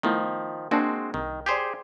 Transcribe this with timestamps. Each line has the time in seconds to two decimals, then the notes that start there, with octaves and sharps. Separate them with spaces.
0.03 D#3 F3 A3 B3 E4
0.71 G#3 A#3 C4 D4 F#4 A5
1.14 C2 D#3
1.46 G4 G#4 C5 D5 C6 G6